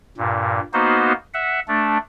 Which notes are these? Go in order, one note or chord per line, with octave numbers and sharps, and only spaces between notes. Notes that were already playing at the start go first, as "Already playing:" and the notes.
G2 A#2
A#3 B3 D#4 F#4 C5
E5 F#5
A3 D4